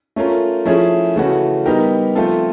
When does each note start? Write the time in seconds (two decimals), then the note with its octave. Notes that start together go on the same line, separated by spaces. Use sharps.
0.16 A3 C#4 F4 A#4
0.65 F3 A3 C#4 E4 G#4
1.16 C#3 E3 A3 C#4 F#4
1.66 G3 B3 D#4 G4 A#4
2.15 F3 A3 C4 F4 A4